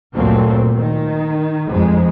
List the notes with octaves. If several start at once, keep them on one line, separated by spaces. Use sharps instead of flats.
D2 G2 A#2 F#3 A3 C4
D#3
F2 G#3